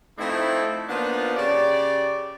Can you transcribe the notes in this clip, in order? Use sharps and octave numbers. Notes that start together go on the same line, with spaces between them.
F3 A3 C4 D#4 E4
F3 A#3 B3 D4 D#4 F4
C#3 G4 C#5 D5